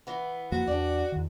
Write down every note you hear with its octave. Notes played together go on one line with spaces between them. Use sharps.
E3 B3
F2 F3 A#3 F#4
E2 B3 D4 G4 D5
E2 D#3